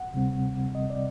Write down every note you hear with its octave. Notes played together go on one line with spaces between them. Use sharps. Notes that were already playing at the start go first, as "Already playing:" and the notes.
Already playing: F#5
D2 C3 G3 C4
D#5
D5